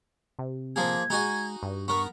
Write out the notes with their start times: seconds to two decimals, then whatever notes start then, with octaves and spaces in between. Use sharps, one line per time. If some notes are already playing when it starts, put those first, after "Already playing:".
0.39 C3
0.76 F3 A#3 G#4 G#6
1.10 G#3 D#4 F#4 G#5
1.63 G2
1.88 B3 A#4 C#6